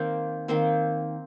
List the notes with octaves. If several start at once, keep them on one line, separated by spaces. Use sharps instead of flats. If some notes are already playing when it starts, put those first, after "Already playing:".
Already playing: D#3 A#3 C4 C5
D#3 A#3 C4 C5